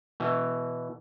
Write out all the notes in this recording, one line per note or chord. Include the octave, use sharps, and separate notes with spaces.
B2 E3